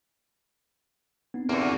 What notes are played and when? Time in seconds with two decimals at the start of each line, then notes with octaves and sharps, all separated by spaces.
1.34 B3 C4 D#4
1.49 E2 D3 A#3 F#4